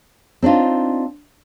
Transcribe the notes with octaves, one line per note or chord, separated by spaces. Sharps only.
C4 D4 D#4 F4